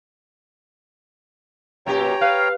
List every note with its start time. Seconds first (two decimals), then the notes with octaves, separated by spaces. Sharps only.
1.86 F#2 A#2 G4 C#5 G5 A#5
2.21 B4 F5